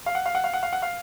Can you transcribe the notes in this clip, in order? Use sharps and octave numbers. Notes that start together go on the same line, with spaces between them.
F5
F#5
F5
F#5
F5
F#5
F5
F#5
F5